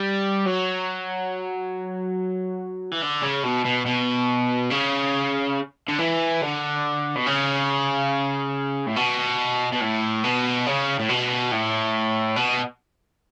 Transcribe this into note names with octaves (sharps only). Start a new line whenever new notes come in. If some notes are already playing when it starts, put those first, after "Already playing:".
Already playing: G3
F#3
E3
D3
C#3
B2
B2
B2
C#3
D3
E3
D3
B2
C#3
A2
B2
B2
A2
B2
C#3
A2
B2
A2
B2